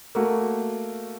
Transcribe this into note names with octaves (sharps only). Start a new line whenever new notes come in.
A3 A#3 F#4